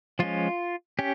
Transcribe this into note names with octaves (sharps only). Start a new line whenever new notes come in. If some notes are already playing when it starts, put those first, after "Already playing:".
F3 G#3 C#4 F4
C#4 G4